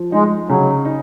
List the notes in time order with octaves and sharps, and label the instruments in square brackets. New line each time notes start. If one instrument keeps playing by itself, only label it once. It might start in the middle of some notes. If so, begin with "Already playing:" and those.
Already playing: [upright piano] F3
[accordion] G#3 [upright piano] D#4
[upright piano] C#3 [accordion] F#3
[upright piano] D#4